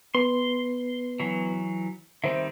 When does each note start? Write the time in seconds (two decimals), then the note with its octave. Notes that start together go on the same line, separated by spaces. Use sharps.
0.15 B3 B4 C6
1.20 E3 F#3
2.24 D#3 G3 C4 C5 E5